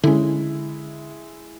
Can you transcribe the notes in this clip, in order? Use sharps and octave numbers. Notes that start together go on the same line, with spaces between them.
D3 G#3 C#4 E4